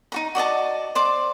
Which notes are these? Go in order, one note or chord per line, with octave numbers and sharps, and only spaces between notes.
D#4 F#4 A#5
F#4 D5 D#5 A5
C5 D5 D6